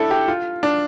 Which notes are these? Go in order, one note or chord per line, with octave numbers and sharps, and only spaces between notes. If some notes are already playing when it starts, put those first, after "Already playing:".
Already playing: D4 E4 A4
G4
F4
D4